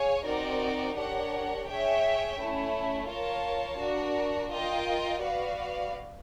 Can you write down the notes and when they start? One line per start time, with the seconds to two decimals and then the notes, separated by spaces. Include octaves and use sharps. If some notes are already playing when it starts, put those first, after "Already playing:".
Already playing: G#4 C#5 F5 G#5
0.25 C4 D#4 F#4 A#4 D5
0.96 D4 G4 A#4 C#5 F#5
1.67 G#4 C#5 E5 G5
2.38 A3 C#4 E4
3.09 F4 A#4 C#5 F5 A5
3.79 D4 F#4 A#4
4.52 F4 A#4 D#5 G5
5.22 F#4 B4 D5 F5